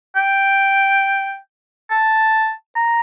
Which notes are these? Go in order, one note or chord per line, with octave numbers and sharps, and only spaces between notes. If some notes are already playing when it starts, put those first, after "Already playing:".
G5
A5
A#5